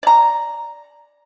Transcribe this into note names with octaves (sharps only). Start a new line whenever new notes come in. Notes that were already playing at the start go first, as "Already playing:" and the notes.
D5 A#5